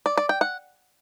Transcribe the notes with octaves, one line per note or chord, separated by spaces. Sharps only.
D5
D5
G5
F#5